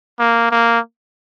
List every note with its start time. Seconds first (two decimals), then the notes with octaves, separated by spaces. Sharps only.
0.19 A#3
0.51 A#3